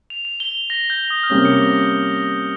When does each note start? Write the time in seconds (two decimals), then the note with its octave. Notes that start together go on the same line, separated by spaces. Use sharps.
0.10 F7
0.25 F7
0.40 G7
0.70 A#6
0.90 G6
1.10 D#6
1.23 F6
1.30 C3 G3 A#3 C#4 D#6
1.45 C#7